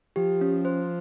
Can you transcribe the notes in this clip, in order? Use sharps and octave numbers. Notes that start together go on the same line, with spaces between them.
F3 G4
C#4
C5